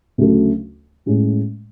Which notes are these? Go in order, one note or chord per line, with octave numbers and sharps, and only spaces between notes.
D2 C#3 F#3 A3
A2 G#3 C#4